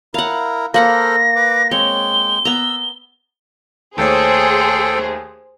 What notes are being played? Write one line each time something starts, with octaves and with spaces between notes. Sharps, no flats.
E4 A#4 F5 F#5
A#3 A4 A#4 C5 F#5 B5 A#6
B4 D6
G#3 C4 C#5 G5 G7
B3 A#5 E6
D#2 A3 G#4 A4 C5 C#5 G5